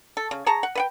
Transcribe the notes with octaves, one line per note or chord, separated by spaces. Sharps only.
A4
C#3
G#4 C#5 A5 A#5
F#5
B4 F#5 G5